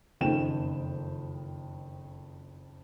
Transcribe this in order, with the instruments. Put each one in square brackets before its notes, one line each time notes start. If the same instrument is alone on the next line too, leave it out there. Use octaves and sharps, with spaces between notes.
[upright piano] F#1 F2 D#3 G5 E7